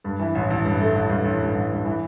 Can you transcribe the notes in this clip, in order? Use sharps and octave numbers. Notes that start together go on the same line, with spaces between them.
G2
E3
A1
A1
G2
A3
A1
G2
A1
G2
A1
G2
E3